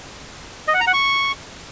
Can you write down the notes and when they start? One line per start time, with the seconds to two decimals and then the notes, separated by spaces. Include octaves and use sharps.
0.68 D#5
0.74 F#5
0.80 A#5
0.87 F#5
0.93 C#6